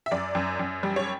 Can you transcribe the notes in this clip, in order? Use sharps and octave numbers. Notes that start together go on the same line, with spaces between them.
E5
F#2 D5
F#2
F#2
G3
C#5